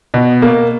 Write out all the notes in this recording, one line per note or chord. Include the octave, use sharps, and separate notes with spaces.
B2
A#3